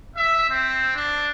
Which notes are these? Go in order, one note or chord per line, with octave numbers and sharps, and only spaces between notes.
E5
C4
D4